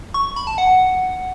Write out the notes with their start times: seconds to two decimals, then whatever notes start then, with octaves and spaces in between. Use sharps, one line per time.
0.14 C#6
0.36 B5
0.47 A5
0.58 F#5